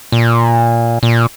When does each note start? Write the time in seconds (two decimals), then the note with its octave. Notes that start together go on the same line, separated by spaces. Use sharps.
0.12 A#2
1.03 A#2